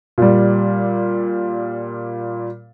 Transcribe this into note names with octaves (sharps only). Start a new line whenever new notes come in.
A#2 G3